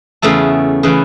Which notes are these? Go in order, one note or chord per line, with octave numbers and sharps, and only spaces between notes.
E2 C#3 E3 A3 A4
C#3 E3 A3